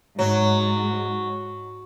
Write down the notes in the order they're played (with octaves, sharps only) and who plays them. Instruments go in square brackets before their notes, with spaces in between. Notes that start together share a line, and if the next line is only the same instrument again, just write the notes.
[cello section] G#2 [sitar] F#3